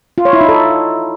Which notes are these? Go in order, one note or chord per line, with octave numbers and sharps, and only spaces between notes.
F4
C#5
E4
D#4
A4